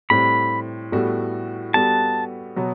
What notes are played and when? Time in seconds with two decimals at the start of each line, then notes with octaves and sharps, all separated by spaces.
0.10 A2 G3 C4 B5
0.92 A2 G3 B3 F#4 A4
1.74 G3 B3 F#4 A4 A5
2.56 B2 F#3 B3 F#4